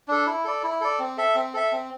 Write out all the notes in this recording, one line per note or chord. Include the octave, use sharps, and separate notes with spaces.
D4 A4
E4
A4 D5
E4
A4 D5
C4
A4 E5
C4
A4 E5
C4